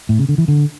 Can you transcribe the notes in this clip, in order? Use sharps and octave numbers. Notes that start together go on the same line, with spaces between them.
A2
C#3
D3
E3
D3